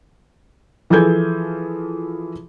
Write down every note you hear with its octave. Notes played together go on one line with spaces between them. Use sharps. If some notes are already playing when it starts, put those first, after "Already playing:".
E3 F3 G#4 A4 G6 G#6